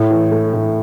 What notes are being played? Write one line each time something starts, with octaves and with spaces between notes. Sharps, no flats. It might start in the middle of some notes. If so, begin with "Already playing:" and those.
Already playing: A2 E4
E3
A3
A2